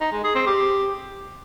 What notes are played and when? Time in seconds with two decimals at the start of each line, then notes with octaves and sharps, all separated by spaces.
0.01 D#4
0.12 G#3
0.24 G#4
0.35 C4
0.46 G4